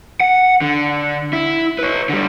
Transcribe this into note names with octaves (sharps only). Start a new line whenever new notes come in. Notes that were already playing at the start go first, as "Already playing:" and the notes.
F#5
D3
E4
B4 C#5
D3 G3